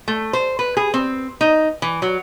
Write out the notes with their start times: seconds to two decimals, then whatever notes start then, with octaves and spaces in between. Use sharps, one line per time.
0.08 A3
0.33 C5
0.59 B4
0.77 G#4
0.94 C4
1.41 D#4
1.82 E3
2.02 F#3